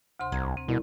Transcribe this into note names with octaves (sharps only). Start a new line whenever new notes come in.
D2 C3 C6
C2 A#5 G#6
C4
C2 B2